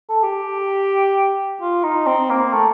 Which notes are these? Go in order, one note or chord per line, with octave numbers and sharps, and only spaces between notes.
A4
G4
F4
D#4
C4
A#3
A3